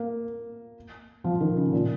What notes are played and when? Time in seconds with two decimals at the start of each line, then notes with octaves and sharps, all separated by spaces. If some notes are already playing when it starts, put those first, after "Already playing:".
Already playing: A#3
1.24 F3
1.41 D#3
1.57 C#3
1.73 A#2